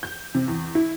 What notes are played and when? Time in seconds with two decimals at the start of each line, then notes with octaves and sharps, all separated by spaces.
0.03 G6
0.35 C3
0.48 E2
0.75 E4